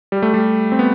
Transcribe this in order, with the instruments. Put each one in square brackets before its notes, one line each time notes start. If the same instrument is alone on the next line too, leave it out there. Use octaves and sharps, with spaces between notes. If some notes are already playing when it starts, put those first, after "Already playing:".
[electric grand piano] G3
A3
G3
C4
B3